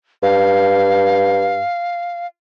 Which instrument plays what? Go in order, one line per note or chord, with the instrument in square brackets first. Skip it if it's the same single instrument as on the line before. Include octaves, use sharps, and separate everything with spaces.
[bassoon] G2 [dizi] F5